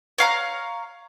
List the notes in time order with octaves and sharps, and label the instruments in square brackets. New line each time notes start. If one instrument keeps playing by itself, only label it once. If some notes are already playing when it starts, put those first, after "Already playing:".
[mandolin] C#5 F5 A#5 F#6